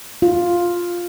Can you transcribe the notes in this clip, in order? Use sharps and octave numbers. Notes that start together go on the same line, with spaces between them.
F4